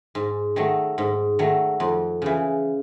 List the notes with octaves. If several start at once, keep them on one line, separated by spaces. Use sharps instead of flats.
G#2
D#3 F#3 A3
G#2
D#3 F#3 A3
F2
C#3 E3